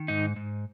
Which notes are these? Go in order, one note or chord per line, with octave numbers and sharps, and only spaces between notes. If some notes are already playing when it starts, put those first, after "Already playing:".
Already playing: D#3
G#2 D#4
G#2